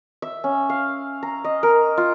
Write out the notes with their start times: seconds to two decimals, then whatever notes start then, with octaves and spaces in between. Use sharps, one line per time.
0.22 E5
0.44 C#4
0.70 F5
1.23 A#5
1.44 D#5
1.63 A#4
1.97 F4